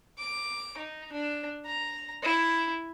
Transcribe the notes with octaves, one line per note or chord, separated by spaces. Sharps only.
D6
D#4
D4
A#5
E4